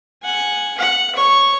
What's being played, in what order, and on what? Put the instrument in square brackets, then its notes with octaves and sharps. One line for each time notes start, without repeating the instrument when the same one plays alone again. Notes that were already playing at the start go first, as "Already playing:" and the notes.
[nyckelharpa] F#5 G#5
F#5
C#5 C#6